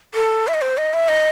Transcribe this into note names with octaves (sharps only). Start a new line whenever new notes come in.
A4
E5
D#5
C5
D#5
E5
D#5